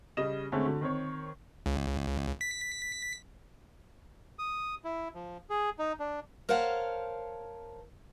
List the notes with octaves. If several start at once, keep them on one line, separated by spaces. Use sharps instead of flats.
C#3 G3 D#5 E7
D3 G#3 A3 C4 C#4
D3 F#3
D#3 C4 C#5
C#2
B6
D#6
E4
F3
G#4
D#4
D4
A#4 C5 C#5 F5 F#5 A5